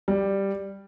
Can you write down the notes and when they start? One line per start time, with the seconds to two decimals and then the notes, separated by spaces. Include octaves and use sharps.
0.08 G3